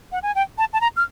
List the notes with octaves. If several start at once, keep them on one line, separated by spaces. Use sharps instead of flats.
F#5
G#5
G5
A5
A5
A#5
F6